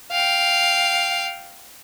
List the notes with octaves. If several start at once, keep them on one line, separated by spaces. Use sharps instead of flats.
F5 G5